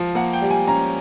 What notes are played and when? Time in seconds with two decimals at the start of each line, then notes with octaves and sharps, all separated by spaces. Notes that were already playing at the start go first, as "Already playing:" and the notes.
Already playing: F3
0.15 A#3 F#5
0.33 G5
0.42 G3
0.51 G#5
0.67 C#4 A#5